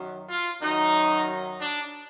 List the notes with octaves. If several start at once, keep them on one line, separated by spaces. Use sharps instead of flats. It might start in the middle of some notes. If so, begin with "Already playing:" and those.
Already playing: F#2 D#3 F#3
F4
F#2 D#3 F#3 D#4
D4